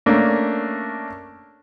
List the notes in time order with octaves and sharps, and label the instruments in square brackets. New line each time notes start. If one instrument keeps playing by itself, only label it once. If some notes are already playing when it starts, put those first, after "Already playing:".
[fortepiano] A3 A#3 C#4 D4